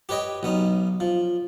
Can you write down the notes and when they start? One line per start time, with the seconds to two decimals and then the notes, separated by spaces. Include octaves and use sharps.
0.09 G4 B4 C#5 D#5 G5
0.43 B1 B3 C#4 D#4
1.00 F3